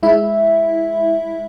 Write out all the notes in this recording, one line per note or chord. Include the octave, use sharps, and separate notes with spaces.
G#3 E4 E5